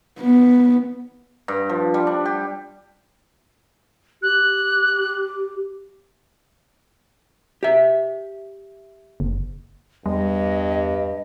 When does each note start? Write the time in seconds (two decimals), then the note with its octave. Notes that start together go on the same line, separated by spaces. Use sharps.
0.20 B3
1.48 G2
1.69 F3
1.94 G3
2.07 D4
2.26 G4
4.23 G4 F#6
7.63 G4 E5
9.20 F#1
10.06 E2 G2 G3 D#5